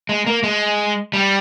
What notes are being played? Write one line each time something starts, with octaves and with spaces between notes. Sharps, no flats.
G#3
A#3
G#3
G3